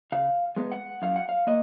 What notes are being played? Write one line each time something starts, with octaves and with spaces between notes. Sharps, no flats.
C#3 F5
G#3 B3
F#5
F#2 F5
F#5
F5
A#3 D#5